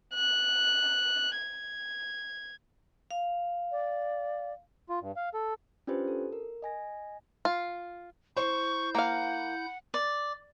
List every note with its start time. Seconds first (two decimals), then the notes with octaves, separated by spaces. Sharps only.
0.15 F#6
1.39 G#6
3.11 F5
3.72 D5
4.89 F4
5.01 G2
5.16 F5
5.34 A4
5.87 C#4 D4 F4 G4 B4 C5
6.08 A4
6.32 A#4
6.62 D#5 G#5 A#6
7.45 F4
8.37 E4 C5 C#6 G6
8.95 A#3 F5 F#5
9.94 D5